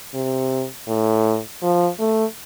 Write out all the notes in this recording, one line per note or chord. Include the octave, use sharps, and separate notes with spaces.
C3
A2
F3
A3